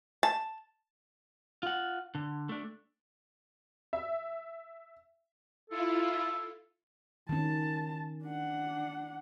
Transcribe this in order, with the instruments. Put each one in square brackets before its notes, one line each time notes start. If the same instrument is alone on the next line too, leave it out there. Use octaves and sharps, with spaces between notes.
[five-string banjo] A5
[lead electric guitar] F4 F#5
D3
A3 D4
[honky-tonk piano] E5
[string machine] E4 F4 [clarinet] A4
[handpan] D#3 C#4 [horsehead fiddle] A5
[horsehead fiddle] D4 F#5